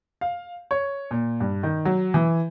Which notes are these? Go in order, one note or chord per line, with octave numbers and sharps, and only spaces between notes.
F5
C#5
A#2
G2
D#3
F#3
E3